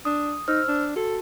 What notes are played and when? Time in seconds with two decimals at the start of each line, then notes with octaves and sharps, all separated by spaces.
0.05 D4 D#6
0.48 D#4 C5 E6 F6
0.68 D4
0.96 F#4 A4